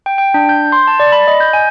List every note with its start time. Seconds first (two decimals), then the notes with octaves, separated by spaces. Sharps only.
0.06 G5
0.18 G5
0.34 D4
0.49 G6
0.72 C6
0.87 A5
1.00 D5
1.12 B5
1.28 D#5
1.40 G6
1.53 G#5